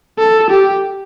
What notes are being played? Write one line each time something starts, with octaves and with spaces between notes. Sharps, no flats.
A4
G4